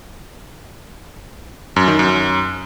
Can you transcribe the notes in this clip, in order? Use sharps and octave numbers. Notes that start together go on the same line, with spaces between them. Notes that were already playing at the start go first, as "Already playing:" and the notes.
F#2
D#3
F#2